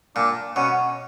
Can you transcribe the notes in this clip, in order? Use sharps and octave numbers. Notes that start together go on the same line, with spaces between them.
A#2 D4
B2 C#4